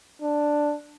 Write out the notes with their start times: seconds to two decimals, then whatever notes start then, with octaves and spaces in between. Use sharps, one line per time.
0.22 D4